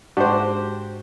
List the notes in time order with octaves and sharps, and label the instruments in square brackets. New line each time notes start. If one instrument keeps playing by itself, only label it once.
[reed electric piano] G#2 D4 F#4 [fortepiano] G4 C5